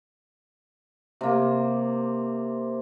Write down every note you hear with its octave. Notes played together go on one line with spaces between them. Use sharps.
C3 A#3